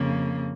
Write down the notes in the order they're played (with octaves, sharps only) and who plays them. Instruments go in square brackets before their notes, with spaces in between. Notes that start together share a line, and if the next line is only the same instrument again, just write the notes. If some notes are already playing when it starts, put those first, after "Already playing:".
Already playing: [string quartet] F2 C#3 A#3